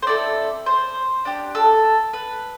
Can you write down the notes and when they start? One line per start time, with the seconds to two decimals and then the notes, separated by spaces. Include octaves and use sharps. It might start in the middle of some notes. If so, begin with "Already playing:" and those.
0.03 C5
0.06 C4 E4 A4 D5
0.66 C5
1.25 D4 G4
1.55 A4
2.13 B4